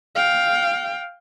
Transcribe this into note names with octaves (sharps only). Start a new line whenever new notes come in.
F5 G5